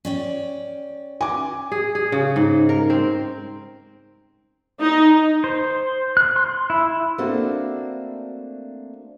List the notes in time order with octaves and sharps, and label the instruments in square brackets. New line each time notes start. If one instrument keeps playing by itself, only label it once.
[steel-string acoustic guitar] C#4 D5 G5
[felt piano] G#5 D6
[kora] G#4
G#4
C#3
G#2
A#4
C4
[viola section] D#4
[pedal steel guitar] C5
F#6
C6
E4
[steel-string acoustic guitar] A3 A#3 C4 D4 F#4